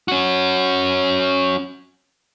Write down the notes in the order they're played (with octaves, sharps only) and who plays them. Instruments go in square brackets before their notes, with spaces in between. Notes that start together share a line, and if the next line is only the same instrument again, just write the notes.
[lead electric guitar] C#4 F#4